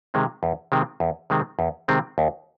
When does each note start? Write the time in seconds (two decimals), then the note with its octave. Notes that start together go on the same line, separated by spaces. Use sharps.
0.14 C3 D#3 G#3 C4
0.43 E2
0.72 C3 D#3 G#3 C4
1.00 E2
1.30 C3 D#3 G#3 C4
1.59 E2
1.88 C3 D#3 G#3 C4
2.18 D#2